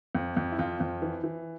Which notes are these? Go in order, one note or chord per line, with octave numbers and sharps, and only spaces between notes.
F2
F2
E4
F2 F4
F2
E3
E3